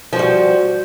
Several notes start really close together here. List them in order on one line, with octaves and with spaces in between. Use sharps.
F3 F#4 G3